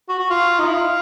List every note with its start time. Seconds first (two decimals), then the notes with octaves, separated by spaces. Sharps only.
0.09 F#4
0.19 F#4
0.30 F4
0.59 D#4
0.67 E4
0.74 F4